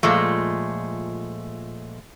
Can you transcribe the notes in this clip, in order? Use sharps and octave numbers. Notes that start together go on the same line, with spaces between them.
A#2 F3 G#3 A3